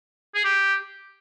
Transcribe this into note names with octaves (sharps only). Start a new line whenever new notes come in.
G#4
G4